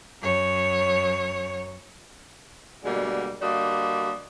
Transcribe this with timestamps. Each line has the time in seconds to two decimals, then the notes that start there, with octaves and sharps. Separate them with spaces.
0.22 F#2 C#5
2.83 B2 D3 G3 G#3 A#3
3.41 D3 G3 A#3 F#4 D#5